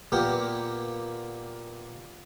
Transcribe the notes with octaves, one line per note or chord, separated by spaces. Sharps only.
A#2 A#3 B3 G4